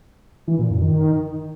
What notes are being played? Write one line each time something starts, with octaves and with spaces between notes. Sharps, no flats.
E3
A#2
F#2
D#3